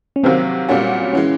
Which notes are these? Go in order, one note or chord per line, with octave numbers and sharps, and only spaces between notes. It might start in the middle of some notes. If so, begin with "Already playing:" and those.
C#4
C3 D#3 F#3 A#3 C4
A#2 G3 A#3 C#4 F#4
E3 G#3 C#4